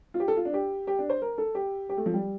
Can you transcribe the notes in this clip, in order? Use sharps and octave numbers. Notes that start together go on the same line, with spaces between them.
F4
G4
A4
F4
D4
G4
G4
D4
C5
A#4
A4
G4
G4
A3
F3
G3